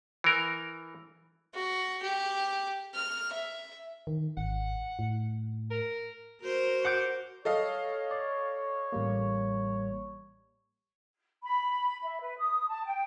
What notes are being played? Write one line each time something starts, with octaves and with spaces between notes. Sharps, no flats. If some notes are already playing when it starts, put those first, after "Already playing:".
E3 A#4
F#4
G4
F6
E5
D#3
G#1 F#5
A2
A#4
F#4 A#4 C5
F#5 D6 G6
A4 C#5 D#5 F5
D5
A1 G3 A#3
B5
E5
B4
D#6
A5
G5